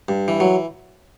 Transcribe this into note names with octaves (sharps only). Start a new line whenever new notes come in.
G2
E3
F#3